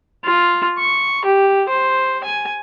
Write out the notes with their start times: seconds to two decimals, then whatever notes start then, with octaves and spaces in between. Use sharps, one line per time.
0.24 F4
0.78 C#6
1.25 G4
1.69 C5
2.24 G#5